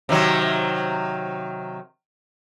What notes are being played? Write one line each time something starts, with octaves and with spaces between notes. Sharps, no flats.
C3 D#3 F#3